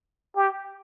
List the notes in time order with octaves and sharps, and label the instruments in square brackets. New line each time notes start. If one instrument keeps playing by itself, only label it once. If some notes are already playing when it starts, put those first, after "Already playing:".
[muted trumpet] G4